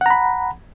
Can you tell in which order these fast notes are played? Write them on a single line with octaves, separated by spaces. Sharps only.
F#5 A#5 B5